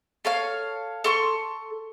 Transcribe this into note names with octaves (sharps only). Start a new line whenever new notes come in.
A4 C#5 F5
A4 C6 C#6